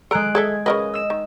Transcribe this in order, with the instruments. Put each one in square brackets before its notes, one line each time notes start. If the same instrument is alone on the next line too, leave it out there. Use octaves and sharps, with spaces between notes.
[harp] G#3 F#6 D7 [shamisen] A4 A#5
[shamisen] G#4 A4 E5 [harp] G#6
[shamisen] C#3 A#4 B4 [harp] D#5
[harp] E6 E7
[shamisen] D#3